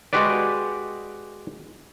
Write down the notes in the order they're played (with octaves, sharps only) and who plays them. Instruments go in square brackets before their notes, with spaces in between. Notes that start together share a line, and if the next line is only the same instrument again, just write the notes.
[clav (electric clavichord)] G#3 F#4 G4 B4 D5